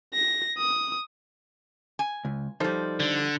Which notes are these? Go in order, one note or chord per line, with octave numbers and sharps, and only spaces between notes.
A#6
D#6
G#5
C#2
F3 G3 D#4 A4 C5
D3